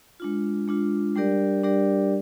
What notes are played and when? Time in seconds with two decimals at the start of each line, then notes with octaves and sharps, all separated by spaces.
0.20 G#3 D4 F4
0.68 G#3 D4 F4
1.16 G3 D4 G4 A#4 D5
1.64 G3 D4 G4 A#4 D5